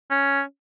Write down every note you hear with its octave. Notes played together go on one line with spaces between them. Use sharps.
C#4